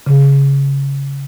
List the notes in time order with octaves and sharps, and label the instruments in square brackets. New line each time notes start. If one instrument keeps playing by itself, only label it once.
[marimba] C#3